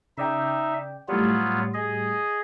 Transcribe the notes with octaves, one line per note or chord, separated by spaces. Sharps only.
C#3 D#4 D5 E5 G5
A2 F#3 G3 B3 F4
G#4 D#5